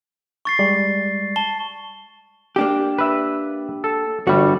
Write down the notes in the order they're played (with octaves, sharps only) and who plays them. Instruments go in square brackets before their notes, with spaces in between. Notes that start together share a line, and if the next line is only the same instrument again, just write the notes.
[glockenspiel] C#6 A6 C7
[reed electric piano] G3 G#3 D5
[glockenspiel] A5 G7
[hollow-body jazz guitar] A#3 D4 G4
[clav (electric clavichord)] B4 E5
A4
[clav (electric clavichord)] G1 G3 [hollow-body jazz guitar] F#4